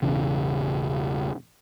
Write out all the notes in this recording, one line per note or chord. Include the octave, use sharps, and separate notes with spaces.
E1 A1 C#3 E3